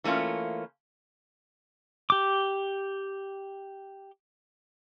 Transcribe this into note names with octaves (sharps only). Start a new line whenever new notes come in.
E3 A3 A#3 C#4 F4
G4 D6